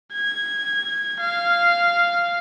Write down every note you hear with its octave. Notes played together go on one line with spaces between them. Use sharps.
G#6
F5